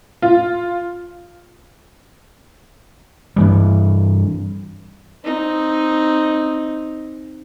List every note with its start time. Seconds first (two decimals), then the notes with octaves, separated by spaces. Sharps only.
0.22 F4
3.36 G2 E3 G3
5.25 C4 D#4